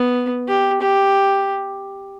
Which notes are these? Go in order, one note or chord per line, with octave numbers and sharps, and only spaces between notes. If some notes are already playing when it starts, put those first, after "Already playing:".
Already playing: B3
G4
G4